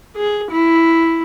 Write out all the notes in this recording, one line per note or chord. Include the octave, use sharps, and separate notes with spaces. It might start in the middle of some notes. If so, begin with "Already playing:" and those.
G#4
E4